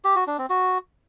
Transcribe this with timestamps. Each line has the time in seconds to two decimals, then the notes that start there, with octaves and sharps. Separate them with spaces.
0.04 G4
0.16 F#4
0.27 D4
0.38 C4
0.50 F#4